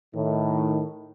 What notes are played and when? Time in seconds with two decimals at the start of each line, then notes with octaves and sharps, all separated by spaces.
0.15 A2 D#3